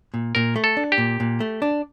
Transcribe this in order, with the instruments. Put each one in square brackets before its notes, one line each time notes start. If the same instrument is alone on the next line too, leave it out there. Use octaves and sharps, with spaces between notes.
[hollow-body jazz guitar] A#2
[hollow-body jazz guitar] A#2 [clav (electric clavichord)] A#4
[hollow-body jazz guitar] A3
[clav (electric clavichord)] A4
[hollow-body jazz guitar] D4
[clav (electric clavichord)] G4
[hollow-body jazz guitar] A#2
A#2
A3
D4